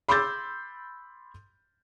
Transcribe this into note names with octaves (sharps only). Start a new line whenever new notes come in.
B5 C6 D6 E6 G6 A6